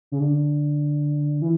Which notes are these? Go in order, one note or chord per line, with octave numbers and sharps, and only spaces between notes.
C#3
D3
E3